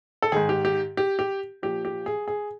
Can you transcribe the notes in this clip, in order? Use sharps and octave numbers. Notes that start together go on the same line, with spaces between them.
A4
G#2 D#3 G#4
G4
G4
G4
G4
A#2 F3 G4
G4
G#4
G#4